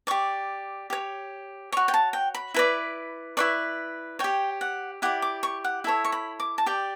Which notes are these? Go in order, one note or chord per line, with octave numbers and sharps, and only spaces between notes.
G4 D5 C#6
G4 C#5
F#4 C#5 C#6
G5
A5
G5
B5
E4 B4 D5
E4 B4 D5 C#6
G4 C#5 G5
F#5
E4 G4 D5 F#5
D6
C#6
F#5
E4 A4 C#5 E5
C#6
B5
D6
A5
G4 D5 G5